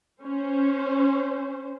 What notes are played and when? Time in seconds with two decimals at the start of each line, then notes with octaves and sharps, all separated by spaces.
0.22 C#4 C5